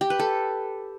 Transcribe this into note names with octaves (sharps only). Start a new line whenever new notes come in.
G4
B4
A4